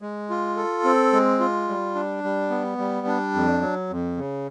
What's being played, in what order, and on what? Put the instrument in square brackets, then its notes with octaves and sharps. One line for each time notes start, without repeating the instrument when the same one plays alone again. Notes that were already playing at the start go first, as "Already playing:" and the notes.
[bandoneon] G#3
F4
A4
C4
G#3
F4
G3
D4
G3
B3
G3
D4
F2
F#3
F2
C#3